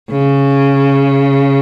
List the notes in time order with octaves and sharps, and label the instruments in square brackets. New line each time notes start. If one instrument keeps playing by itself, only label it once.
[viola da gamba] C#3